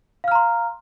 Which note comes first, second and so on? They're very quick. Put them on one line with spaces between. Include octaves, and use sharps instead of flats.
F5 F6 A#5 C6